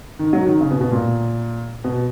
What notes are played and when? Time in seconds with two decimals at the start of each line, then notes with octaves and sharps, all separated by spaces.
0.19 D#3
0.33 F#3
0.47 D#3
0.61 C#3
0.71 B2
0.81 B2
0.91 A#2
1.84 B2